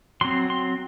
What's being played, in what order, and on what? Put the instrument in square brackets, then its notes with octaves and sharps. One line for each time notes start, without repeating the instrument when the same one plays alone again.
[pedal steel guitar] F#3 C4 C6
C6